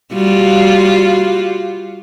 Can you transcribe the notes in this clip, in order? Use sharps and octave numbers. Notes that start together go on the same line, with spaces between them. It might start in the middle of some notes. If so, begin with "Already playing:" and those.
G3 F4 F#4